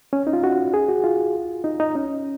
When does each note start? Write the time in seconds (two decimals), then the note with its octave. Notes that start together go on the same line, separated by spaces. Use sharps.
0.13 C#4
0.27 D#4
0.33 F4
0.44 F#4
0.74 G#4
0.89 F#4
1.04 F4
1.64 D#4
1.80 D#4
1.95 C#4